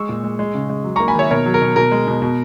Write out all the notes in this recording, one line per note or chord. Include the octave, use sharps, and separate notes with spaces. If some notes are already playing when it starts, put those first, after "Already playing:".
Already playing: G#3 C#6 E6
A#2
G#3
G#3
C#3
G#3
F#3
A#3 A#5 C#6
G#5 B5
D#3 C#5 E5
B2 A#4 C#5
F#3
A#4
B2
B2 A#4
G#3
B2
B2